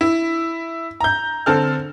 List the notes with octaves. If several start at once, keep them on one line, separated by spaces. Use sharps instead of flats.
E4
A#5 G6
D3 C4 A4 F6